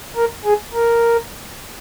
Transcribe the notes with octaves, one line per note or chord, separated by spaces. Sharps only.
A#4
G#4
A#4